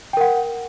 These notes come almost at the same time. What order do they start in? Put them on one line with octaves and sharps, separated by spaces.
G5 A#4 F#5